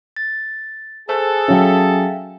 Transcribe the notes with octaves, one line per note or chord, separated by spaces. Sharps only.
A6
G#4 A4 C5
F#3 C#4 E5 F5 G5